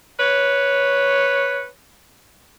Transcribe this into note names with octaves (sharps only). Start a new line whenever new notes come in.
B4 C#5